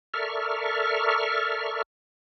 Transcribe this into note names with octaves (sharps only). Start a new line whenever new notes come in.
A4 A#4 D5 E5 C#6 F6